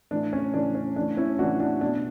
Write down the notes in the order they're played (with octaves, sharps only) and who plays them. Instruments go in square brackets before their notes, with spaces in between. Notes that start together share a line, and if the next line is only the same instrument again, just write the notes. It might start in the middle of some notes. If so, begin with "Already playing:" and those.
[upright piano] A2 E3 D4
C#4
A2 E3 D4
C#4
A2 E3 D4
C#4 E4
A2 E3 D4 F#4
D4 F#4
B2 D4